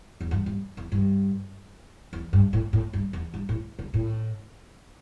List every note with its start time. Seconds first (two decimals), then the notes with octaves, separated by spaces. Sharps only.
0.21 E2
0.31 G2
0.46 G2
0.77 E2
0.92 G2
2.13 E2
2.33 G2
2.53 A2
2.73 A2
2.93 G2
3.13 E2
3.34 G2
3.49 A2
3.79 D3
3.94 A2